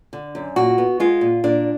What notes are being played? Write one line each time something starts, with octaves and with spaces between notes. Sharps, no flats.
D3
F#2
A#2 F#4
B3
G#3 F4
A#2
A#2 D4